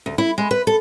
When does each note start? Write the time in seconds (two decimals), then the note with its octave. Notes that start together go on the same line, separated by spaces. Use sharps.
0.06 D2
0.18 E4
0.38 G#3
0.51 B4
0.67 A4